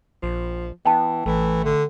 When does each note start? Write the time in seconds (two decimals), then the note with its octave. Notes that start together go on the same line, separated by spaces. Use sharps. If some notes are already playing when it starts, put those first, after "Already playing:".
0.23 A#1 F3
0.85 E3 B3 G5 A5
1.26 A1 E3 A3
1.64 D3